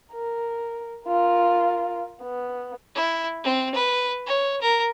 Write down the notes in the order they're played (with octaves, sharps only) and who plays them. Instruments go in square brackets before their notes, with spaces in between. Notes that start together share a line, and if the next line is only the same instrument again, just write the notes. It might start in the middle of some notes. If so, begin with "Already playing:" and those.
[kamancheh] A#4
F4 A#4
B3
[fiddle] E4
C4
B4
C#5
A#4